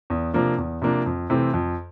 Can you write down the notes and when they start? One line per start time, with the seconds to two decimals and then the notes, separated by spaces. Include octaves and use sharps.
0.10 E2
0.34 C3 F3 A#3 D4
0.58 E2
0.82 C3 F3 A#3 D4
1.06 F2
1.30 C3 E3 A3 C4
1.54 F2